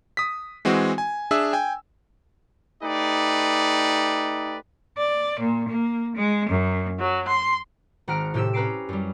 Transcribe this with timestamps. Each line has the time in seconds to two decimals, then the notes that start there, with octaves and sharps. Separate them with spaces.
0.17 D#6 B6
0.65 E3 G#3 C4 F#4
0.98 G#5
1.31 D4 G#4 E5 E6
1.53 G5 G#5
2.82 A3 D#4 G4 B4 D5
4.97 D5
5.38 A#2
5.69 A#3
6.15 G#3
6.49 F#2
6.99 F#3
7.27 C6
8.08 G#1 F#5 A#5 F6 D7
8.34 A2 C3 G4 E6 E7
8.53 C#4 B4 A#5 D6 C7 D7
8.89 F#2 G3